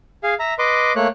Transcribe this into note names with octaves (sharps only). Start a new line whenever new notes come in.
G#4 F5
E5 A#5
B4 D#5 C6 D6
A3 A#3 C#5 F#6